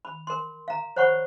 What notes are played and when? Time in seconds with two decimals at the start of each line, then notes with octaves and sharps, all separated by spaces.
0.05 B5
0.27 A#4 C6
0.68 F5 A#5
0.96 C5 C#5 F#5 B5 C#6